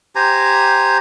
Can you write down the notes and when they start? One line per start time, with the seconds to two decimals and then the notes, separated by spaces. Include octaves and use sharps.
0.15 G4 C5 G#5 A#5